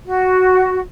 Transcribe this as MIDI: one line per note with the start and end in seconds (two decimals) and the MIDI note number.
0.06 0.81 66